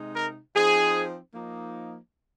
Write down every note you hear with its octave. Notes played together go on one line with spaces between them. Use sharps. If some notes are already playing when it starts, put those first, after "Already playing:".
Already playing: C3 G#3 D#4
A#4
F3 C4 D#4 G#4
F3 A#3 D#4